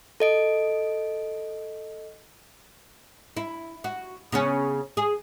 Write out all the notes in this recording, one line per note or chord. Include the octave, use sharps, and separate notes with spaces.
A4 D#5 D7
E4
F#4
C#3 B3 C#4
G#4